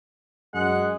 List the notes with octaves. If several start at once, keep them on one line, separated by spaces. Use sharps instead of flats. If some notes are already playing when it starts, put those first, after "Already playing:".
F#2 G#3 F#5